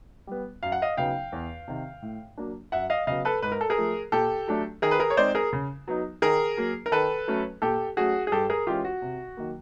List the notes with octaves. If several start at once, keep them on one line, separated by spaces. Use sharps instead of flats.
G3 B3
F#2 F5
F#5
D#5 F5
C#3 F#3 B3 D#4 F5 G5
E2
C3 D#3
A2
F#3 A#3 D4
F#2 E5 F#5
D#5 F5
C#3 F#3 B3 D#5 F5
A4 B4
G#2 B4
A#4
A4
G#4 A#4
F3 A3
A#2 G4 A4
F#3 A3 D4
D#3 G#4 A#4
B4
G#4 A#4
C#5
G#3 C4 D#4 C5 D5
G#4 A#4
C#3
F#3 B3 D#4
D#3 G#4 A#4
F#3 A#3
A#4
D#3 A4 B4
F#3 A3 C#4
A#2 G4 A4
F#3 A3 C#4 F#4 G#4
G#4
G2 G4 A4
G#4 A#4
E3 G#3 C#4 F4 G4
F#4
C3
D#3 F#3 A#3